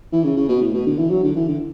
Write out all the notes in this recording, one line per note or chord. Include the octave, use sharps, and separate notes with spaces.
E3
C#3
C#3
B2
A2
B2
D3
E3
F#3
D3
E3
D3